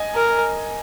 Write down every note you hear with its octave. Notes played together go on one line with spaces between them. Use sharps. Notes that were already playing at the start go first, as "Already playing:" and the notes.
Already playing: D#5 G#5
A#4